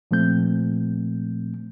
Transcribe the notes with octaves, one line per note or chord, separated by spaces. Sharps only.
A#2 F3 A3 C4 G6